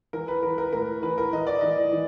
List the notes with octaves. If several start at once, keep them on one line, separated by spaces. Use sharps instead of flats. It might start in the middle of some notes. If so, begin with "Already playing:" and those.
E3 A#4
B4
E3 A#4
A#4
A2 A#4
E3 B4
A#4
E3 D#5
D5
E3 D#5
E3